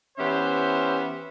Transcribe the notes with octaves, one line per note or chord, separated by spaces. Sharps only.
E3 B3 C#4 G4 C5 E5